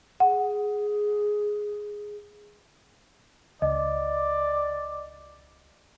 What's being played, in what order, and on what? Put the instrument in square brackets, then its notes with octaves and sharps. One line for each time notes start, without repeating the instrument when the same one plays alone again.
[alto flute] G#4 [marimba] F#5
[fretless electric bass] C#2 [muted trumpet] D5 [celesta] D#5